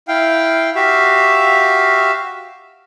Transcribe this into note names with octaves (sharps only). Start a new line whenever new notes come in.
E4 F5 G5
F#4 G4 E5 F5